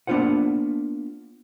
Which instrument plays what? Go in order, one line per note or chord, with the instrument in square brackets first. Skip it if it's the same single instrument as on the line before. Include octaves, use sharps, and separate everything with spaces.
[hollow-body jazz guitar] A#3 B3 D4 F4 C5 F#5